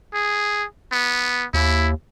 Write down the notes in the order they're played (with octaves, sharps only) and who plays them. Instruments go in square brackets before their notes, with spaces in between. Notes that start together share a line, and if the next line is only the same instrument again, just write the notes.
[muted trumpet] G#4
B3
[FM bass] D#2 [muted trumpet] E4